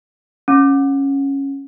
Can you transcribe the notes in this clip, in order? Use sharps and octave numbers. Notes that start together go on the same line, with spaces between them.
C#4